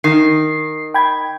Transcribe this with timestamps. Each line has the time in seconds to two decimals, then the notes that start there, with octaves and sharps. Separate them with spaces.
0.04 D#3 C7
0.94 G5 B5 G#6